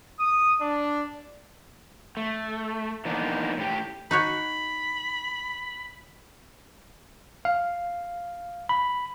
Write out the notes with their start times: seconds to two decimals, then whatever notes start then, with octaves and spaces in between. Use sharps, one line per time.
0.19 D#6
0.61 D4
2.17 A3
3.05 E3 A#3 B3 D4 D#4
3.57 A2 G4
4.11 D#4 F#4 C#5 B5
7.45 F5
8.69 B5